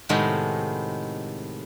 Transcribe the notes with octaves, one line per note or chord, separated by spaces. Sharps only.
A2 C3 D#3 G#3 A3 B3